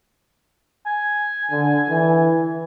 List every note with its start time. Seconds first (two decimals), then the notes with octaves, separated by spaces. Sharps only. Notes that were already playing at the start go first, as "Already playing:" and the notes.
0.86 G#5
1.51 D3
1.90 E3